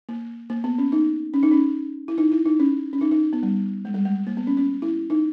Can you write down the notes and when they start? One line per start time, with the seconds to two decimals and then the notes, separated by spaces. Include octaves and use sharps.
0.09 A#3
0.50 A#3
0.64 B3
0.78 C#4
0.92 D#4
1.34 C#4
1.43 D#4
1.51 C#4
2.08 E4
2.18 D#4
2.32 E4
2.46 D#4
2.60 C#4
2.93 C#4
3.01 D#4
3.12 D#4
3.33 B3
3.43 G3
3.85 G#3
3.94 G3
4.05 G#3
4.27 A#3
4.37 B3
4.47 C#4
4.57 C#4
4.82 E4
5.10 D#4